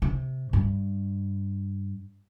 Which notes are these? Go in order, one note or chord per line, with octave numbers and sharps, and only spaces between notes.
C3
G2